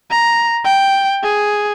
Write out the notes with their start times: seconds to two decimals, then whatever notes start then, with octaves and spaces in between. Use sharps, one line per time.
0.11 A#5
0.65 G5
1.23 G#4